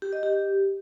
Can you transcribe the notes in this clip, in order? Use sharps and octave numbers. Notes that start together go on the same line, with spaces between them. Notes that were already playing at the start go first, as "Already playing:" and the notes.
G4
D#5
G4